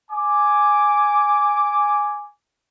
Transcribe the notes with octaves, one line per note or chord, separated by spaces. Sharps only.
G#5 D6